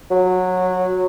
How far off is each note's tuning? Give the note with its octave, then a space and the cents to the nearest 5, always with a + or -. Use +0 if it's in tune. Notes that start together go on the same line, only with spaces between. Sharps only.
F#3 -15